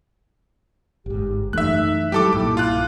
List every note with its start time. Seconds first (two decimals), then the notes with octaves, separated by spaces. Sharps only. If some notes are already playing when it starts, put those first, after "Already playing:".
1.06 G1 G#2 G4
1.53 F#2 E3 A3 D#4 E5 F#6
2.12 F#3 G#3 E4 G4 A4 D6
2.33 B1 G2 A#2 D6
2.57 F4 F#6